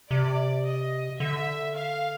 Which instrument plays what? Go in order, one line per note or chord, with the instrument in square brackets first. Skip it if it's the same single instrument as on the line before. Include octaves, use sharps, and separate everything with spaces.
[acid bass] C3 [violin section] D5
[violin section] D#5
[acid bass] D3 [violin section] E5
[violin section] F5